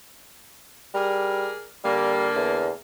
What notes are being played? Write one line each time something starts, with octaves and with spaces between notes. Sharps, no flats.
G3 G#4 A#4 D5
D3 G3 A#3
E2